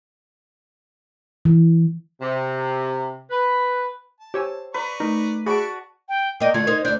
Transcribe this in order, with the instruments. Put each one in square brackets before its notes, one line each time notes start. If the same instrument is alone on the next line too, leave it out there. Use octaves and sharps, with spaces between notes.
[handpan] E3
[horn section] C3
B4
[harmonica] A5
[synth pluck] G4 C#5 E6 [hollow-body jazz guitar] C5 G#5
[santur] B4 [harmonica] D5 A#5 C#6
[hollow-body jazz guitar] A3 A#4 [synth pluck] D#4
[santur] F#4 D5 A5 [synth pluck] G#4 D7 [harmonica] E5 B5 C#6
[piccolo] G5
[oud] A#3 D#5 [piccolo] G5
[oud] D3 A3 F4 [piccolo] G#6
[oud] D#4 A#4 C5
[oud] D2 D4 [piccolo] G6